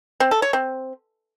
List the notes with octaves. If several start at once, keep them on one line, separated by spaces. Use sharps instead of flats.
C4
A4
C#5
C4